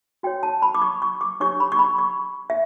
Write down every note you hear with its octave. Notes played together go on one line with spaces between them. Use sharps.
F#4 C#5 G5
A5
B5
D6
C#6
C#6
D6
D4 G4 C#5 C#6
B5
C#6
B5
C#6
E5